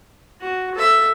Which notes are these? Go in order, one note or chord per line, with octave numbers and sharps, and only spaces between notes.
F#4
A4 E5